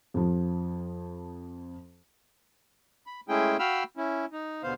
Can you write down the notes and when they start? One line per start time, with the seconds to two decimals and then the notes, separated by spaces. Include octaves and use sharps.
0.14 F2 F3
3.07 B5
3.29 G#3 A3 C#4 E4 G#4 G5
3.59 F#4 F5 G5 B5 E6 F6
3.97 C#4 E4
4.33 D#4
4.63 D#2 B2 D3 B3 C5 F5